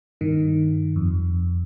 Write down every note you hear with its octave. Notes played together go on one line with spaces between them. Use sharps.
G2 D#3
F2